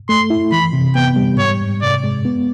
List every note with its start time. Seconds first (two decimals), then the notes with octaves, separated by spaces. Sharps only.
0.09 A3 C6
0.30 E4
0.52 E3 B5
0.73 C3
0.95 B3 G5
1.16 G3
1.38 G#2 C#5
1.61 G#2
1.82 C3 D5
2.04 G#3
2.25 B3